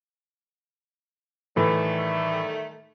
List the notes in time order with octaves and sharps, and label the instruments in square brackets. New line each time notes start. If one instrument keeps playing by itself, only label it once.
[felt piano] A2 E3 [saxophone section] D#3 G3 A3